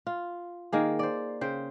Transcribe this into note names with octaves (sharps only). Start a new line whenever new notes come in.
F4
D#3 A#3 G#4
C5 D5
C#3 C5 G5